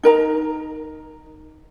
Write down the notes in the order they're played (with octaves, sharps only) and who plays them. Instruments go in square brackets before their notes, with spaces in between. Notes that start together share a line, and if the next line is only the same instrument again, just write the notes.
[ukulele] D#4 A#4 A#5